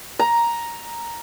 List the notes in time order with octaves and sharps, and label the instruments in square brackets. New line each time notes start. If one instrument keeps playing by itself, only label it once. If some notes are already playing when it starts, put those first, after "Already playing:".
[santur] A#5